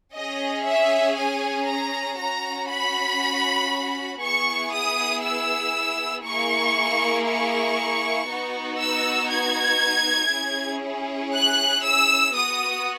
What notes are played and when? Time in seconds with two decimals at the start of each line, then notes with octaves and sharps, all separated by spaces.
0.15 C#4 G#4 D#5
0.67 E5
1.18 G#5
1.67 A#5
2.18 C#4 F#4 A#5
2.70 B5
4.23 B3 E4 G#4 C#6
4.73 D#6
5.24 E6
6.25 A#3 E4 G#4 C#6
7.28 C#6
8.29 B3 D#4 F#4
8.80 E6
9.30 G#6
10.32 C#4 E4 G#4
11.34 F#6
11.84 E6
12.36 B3 F#4 D#6